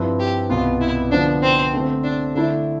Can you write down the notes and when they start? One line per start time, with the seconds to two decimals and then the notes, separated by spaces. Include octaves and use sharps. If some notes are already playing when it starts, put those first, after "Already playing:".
Already playing: G2 F3 C4 E4 B4
0.20 G4
0.50 C2 B2 B3 F4
0.81 E4
1.11 D3 F3 B3 D4
1.43 C4
1.73 D3 A3 C4
2.04 D4
2.35 D3 A3 D4 E4